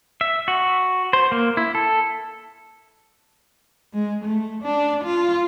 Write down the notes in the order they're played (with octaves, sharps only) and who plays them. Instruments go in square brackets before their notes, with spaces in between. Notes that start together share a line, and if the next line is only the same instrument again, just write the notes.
[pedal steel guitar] E5
F#4
C5
A#3
E4
A4
[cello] G#3
A3
D4
F4